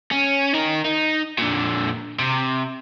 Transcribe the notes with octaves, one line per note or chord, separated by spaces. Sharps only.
C#4
D#4 A#4
D#4
A#2 D3
C3